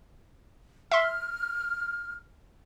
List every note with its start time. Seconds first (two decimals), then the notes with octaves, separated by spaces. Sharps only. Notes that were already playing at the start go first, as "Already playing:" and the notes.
0.92 E5 C6 F6